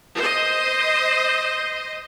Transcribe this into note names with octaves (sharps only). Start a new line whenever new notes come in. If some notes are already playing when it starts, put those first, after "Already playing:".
C5 D#5